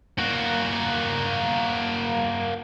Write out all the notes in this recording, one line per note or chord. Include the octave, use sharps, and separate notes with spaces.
A#3 F#4